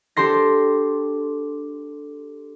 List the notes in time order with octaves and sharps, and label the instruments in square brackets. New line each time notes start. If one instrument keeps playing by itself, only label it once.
[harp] D4 G4 A4 C6 A#6